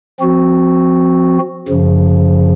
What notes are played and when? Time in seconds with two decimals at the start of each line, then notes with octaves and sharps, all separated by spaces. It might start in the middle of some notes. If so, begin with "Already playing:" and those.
0.20 F3 C4 F#4
1.68 F#2 C#3 F3